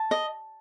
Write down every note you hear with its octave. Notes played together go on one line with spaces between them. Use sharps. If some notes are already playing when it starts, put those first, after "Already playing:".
Already playing: A5
D#5